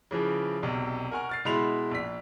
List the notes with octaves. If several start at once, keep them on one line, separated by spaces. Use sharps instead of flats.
C#3 E3 F3
E1 B1 C3
A#4 F#5 G#5 C#6 F6
F6 A6 C7
B2 G#3 E4 B5 C6 F7
A#1 B6